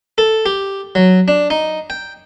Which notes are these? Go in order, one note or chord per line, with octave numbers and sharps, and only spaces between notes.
A4
G4
F#3
D4
D#4
G5